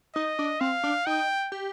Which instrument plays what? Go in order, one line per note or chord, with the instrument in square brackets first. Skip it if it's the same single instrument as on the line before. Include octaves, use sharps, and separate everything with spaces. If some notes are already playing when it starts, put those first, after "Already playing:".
[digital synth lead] D#4 [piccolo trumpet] D#5
[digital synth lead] D4
[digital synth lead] C4 [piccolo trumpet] F5
[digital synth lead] D4
[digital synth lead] D#4 [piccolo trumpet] G5
[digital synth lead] G4